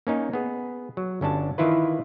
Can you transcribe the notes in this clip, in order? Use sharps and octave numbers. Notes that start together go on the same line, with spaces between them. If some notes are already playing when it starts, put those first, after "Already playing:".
A#3 C#4 D#4
B3 G#4
F#3
G1 C#4 D4 A5
D#3 E3 E4 F4 B4